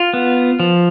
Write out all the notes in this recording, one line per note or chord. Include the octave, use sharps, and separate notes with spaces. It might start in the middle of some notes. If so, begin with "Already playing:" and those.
Already playing: F4
B3
F3